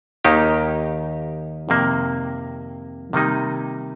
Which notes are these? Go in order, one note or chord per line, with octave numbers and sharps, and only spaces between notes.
D#2 D#3 A#3 D#4 G4
F2 C3 D#3 A#3
C3 D#3 G3 A#3 D#4